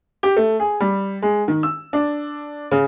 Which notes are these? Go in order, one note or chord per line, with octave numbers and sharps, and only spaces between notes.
G4
A3
G#4
G3
G#3
D#3
E6
D4
C#3